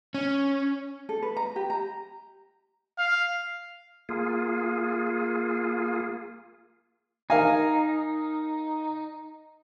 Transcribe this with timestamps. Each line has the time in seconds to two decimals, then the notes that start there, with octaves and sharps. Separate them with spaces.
0.14 C#4
1.09 A4
1.22 B4
1.37 A#5
1.56 G4
1.70 A#5
2.98 F5
4.09 A#3 F4 G#4
7.30 D#4 A#4 F5 G#5